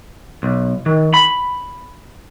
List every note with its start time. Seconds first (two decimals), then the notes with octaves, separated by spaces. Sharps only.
0.43 B1
0.86 D#3
1.14 B5